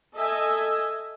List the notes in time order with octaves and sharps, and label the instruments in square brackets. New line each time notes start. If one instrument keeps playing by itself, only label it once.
[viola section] A4 D#5 E5 G#5